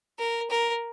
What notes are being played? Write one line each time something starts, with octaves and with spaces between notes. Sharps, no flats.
A#4
A#4